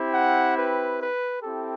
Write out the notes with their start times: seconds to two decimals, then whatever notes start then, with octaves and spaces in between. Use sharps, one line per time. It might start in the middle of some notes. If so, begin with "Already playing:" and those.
Already playing: C4 E4 G4
0.14 F#5
0.57 B4
1.01 B4
1.43 C4 E4 G4 A4